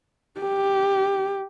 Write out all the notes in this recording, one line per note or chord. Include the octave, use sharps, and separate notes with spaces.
G4